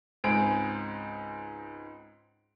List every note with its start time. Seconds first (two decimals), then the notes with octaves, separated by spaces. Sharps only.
0.24 C#2 G#2 C4 G#4 D7